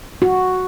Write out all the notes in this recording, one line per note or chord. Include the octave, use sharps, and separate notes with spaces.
F#4